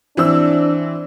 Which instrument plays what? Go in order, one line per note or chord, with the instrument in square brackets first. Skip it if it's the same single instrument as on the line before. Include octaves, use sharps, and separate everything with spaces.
[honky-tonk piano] E3 C4 E6 [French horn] D4